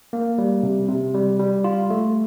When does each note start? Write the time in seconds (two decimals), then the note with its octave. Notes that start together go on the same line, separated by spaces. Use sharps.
0.13 A#3
0.38 G3
0.63 C3
0.88 C3
1.14 G3
1.39 G3
1.64 F4
1.90 A3